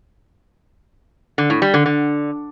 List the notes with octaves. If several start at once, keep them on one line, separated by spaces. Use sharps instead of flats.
D3
A2
G3
D3
D3